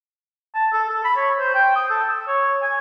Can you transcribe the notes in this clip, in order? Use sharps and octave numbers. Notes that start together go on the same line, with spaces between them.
A5
A4
A4
B5
C#5
C5
G5
D#6
A4
E6
C#5
G#5